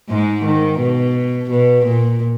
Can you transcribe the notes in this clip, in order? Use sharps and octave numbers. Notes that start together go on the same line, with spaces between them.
G#2 G#3
D#3
B2
B2
A#2